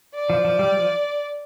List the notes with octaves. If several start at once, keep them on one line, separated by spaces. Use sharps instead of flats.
D5
F3
F3
G3
F3